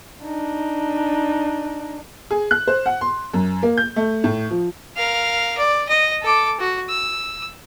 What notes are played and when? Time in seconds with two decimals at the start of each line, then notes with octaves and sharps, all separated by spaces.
0.25 D4 D#4
2.31 G#4
2.51 F#6
2.67 C5
2.86 F#5
3.01 C6
3.34 F#2
3.63 A#3
3.77 G6
3.96 A3
4.24 A2
4.51 F3
4.96 A#4 F5
5.58 D5
5.89 D#5
6.22 A4 D6
6.60 F#4
6.89 E6